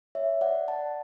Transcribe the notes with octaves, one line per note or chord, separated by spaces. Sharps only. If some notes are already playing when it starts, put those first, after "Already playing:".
C#5 E5
D5 F#5
F#5 A5